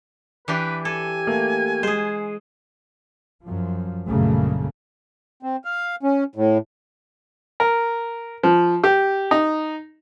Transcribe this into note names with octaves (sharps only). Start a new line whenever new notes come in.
E3 D4 G4 B4
G4 A4 G#5
A3 A#3
G#3 G#4 C5
F#2 F3
A#1 F#2 C#3 G3 A3 A#3
C4
F5
C#4
A2
A#4
F3
G4
D#4